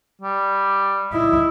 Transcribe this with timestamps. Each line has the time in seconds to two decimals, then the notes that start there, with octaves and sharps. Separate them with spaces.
0.22 G3
1.13 E4 D#5